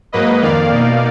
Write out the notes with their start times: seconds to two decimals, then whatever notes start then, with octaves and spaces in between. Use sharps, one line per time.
0.12 G#2 F#3 A#3 B4 D#5
0.42 F2 D#3 A#3 D5 F5
0.72 B2 A#3 D#4